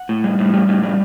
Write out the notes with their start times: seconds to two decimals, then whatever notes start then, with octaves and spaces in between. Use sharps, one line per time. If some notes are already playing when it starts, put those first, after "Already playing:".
Already playing: F#5
0.09 A2
0.24 G3
0.39 A2
0.54 G3
0.68 A2
0.83 G3